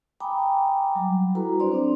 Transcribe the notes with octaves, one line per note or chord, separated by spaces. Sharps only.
G5 G#5 A#5 B5 D6 D#6
F#3 G3
E4 F#4 A4 B4 A#5
D4 C5 D5 C6
C4 D4